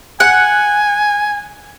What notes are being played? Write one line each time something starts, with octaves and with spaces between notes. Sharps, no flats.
F#5 G#5